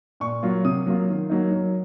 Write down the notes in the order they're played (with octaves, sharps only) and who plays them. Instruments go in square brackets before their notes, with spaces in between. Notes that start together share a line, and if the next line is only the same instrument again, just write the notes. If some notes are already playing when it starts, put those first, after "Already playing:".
[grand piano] A#2 C#6
F#3 A#3 F4
C3 D#6
F#3 A#3 F4
D#3
F#3 A#3 D#4
F#3